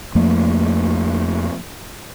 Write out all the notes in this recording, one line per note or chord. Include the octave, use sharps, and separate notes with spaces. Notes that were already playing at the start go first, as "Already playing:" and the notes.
F2 F3 A3 A#3